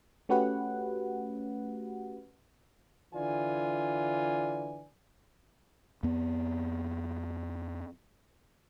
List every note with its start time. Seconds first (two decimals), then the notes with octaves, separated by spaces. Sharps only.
0.29 A3 C#4 F#4 G4 B4 F#5
3.14 D3 E3 F4 D5 G#5
6.03 F2 B3